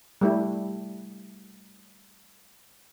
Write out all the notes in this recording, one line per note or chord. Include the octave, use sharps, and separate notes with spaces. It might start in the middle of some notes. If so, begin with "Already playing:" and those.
G3 A3 E4